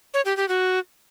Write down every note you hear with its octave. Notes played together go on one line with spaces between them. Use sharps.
C#5
G4
G4
F#4